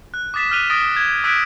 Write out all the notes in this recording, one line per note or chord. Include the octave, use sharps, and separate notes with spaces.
F#6
D6 D#6 A6 B6 E7
F6 F#6 B6 D#7 F7 G7
D#6 A6 A#6 D7
G#6
D6 E6 F#6 G#6 B6 D7